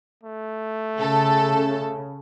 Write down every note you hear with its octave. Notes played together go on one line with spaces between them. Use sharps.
A3
C#3 A4